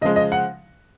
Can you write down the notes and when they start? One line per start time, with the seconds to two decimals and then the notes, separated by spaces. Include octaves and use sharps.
0.01 C#3 D#5
0.05 F3 G#3
0.16 D#5
0.32 F#5